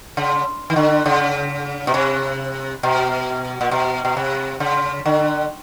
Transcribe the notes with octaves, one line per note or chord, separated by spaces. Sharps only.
C#3
D#3
D3
C#3
B2
C3
B2
A#2
B2
B2
C3
C#3
D3